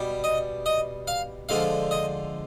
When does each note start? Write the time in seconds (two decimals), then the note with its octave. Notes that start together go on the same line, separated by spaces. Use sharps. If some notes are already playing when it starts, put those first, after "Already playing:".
Already playing: B2 G3
0.24 D#5
0.66 D#5
1.08 F5
1.49 D3 F3 G#3 F5
1.91 D#5